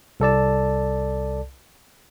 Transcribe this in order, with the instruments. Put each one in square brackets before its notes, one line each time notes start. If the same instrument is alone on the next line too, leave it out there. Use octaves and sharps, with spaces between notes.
[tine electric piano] C2 A4 D5 A5